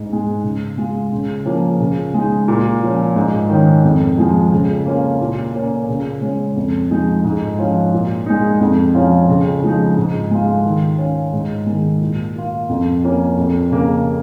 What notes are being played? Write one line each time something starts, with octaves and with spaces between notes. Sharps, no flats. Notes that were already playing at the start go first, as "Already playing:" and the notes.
Already playing: G#2
G#3 D#4
C#3
G#3 F4
C#3
F3 A#3 C#4
C#3
G#3 D#4
A#2
F3 C#4
G#2
D#3 C#4
F2
F3 G#3
C#3
A#3 C#4 F4
A#2
A#3 C#4
C#3
G#3 C#4
F2
F3 G#3 D#4
G#2
F3 C#4 F4
A#2
G#3 D#4
F2
F3 C#4 F4
C#3
F3 G#3 D#4
G#2
G#3 F4
D#3
C#4 F4
G#2
D#3 G#3
A#2
A#3 F4
F2
F3 A#3 C#4
F2
C#3 A#3